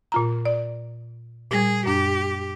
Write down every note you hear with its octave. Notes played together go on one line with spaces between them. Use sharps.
A#2 F4 A#5
D5
A#2 G3 G#4 G#6
F#2 D4 G4